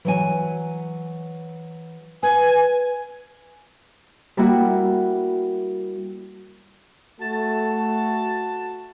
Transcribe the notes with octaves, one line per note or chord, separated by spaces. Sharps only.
E3 F#3 G#5
B4 G#5
G3 A#3 E4 F#4
A3 F#4 A5